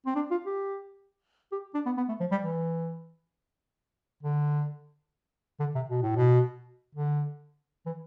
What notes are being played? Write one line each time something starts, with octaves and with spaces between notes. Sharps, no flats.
C4
D4
F4
G4
G4
D4
B3
B3
A3
F3
G3
E3
D3
D3
C3
B2
A2
B2
D3
E3